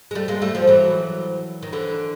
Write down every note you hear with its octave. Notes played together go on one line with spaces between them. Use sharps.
G#3
G3 A3
G#3 A#3
G3 A3
F3 G3
E3 F#3
D#3
D3 E3